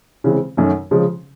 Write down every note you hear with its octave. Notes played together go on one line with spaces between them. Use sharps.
C#3 E3 G#3 C4
F#2 D#3 F#3 A3 C#4
C#3 F3 G#3